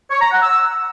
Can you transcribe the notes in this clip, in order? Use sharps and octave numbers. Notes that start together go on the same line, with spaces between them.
C#5
A#5
F#5
E6